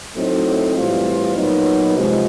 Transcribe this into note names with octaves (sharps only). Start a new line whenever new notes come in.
A2 F#3 A3 C4 D#4
A2 E3 G3 C4 F4
A#2 F#3 B3 D#4
F2 C3 F3 G#3